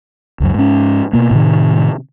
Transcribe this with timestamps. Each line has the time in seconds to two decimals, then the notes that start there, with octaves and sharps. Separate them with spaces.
0.40 C#2 F#2
0.55 G#2 C#4
1.13 B2 A#3
1.31 A2 C3 D#3